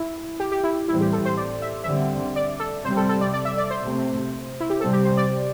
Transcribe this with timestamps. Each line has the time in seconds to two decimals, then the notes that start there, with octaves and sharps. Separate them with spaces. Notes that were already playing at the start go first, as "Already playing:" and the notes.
Already playing: E4
0.40 G4
0.52 G4
0.64 E4
0.88 A2 E3 G3 C4 E4
1.01 G4
1.13 A4
1.25 C5
1.37 D5
1.62 E5
1.84 D3 G3 C4 E5
2.36 D5
2.60 A4
2.84 C3 G3 C4 C5
2.97 A4
3.09 A4
3.21 D5
3.33 D5
3.45 E5
3.57 D5
3.70 C5
3.82 C3 A3 C4
4.60 E4
4.70 G4
4.80 C3 G3 C4 A4
4.93 G4
5.05 C5
5.17 D5